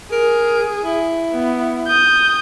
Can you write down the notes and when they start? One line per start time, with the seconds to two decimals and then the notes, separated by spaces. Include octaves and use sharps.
0.12 G#4 A#4
0.82 E4
1.33 B3
1.87 D#6 G6